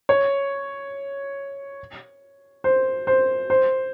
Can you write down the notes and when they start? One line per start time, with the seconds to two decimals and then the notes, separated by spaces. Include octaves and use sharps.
0.09 C#5
2.64 C5
3.07 C5
3.50 C5